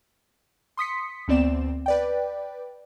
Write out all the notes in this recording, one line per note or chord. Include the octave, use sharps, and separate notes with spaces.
C6 D#6 B6 C#7
D2 B3 C4 D5 E7
B4 D5 G5